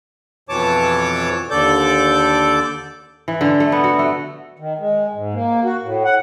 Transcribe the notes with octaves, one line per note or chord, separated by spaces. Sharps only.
F2 B2 E3 C#5 A5 D6
D#2 D3 A4 D5 D6 G6
E3
D3
A3
B3
F#4
A3
D#3
G#3
G#2
A#3
F#4
A2
F#5